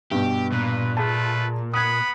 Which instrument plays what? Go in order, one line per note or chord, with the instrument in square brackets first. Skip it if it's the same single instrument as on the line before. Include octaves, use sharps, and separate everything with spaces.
[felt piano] G2 B2 [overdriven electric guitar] G4
[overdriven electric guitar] A#2 [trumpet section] B4
[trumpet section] A3 F4 B4 [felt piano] G#4 A5
[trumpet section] B3 F#5 B5 [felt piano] D#6 G#6